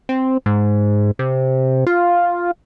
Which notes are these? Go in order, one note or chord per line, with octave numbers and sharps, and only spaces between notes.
C4
G#2
C3
F4